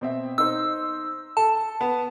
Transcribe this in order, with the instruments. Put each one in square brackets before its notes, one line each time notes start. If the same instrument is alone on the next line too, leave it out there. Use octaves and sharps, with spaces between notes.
[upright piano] B2 C4 E5
[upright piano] D#4 C5 [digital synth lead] E6
[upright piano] A4 [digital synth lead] A5
[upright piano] B3